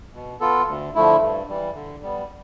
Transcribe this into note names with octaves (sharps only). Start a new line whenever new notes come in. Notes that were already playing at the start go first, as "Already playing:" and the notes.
B2
B3 F4 A4
D2
D3 F3 A3 E4
G2
E3 G3
D3
G3 B3